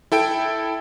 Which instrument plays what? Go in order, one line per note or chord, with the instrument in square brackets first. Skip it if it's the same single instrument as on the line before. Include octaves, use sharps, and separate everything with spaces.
[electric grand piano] E4 A4 G5 D7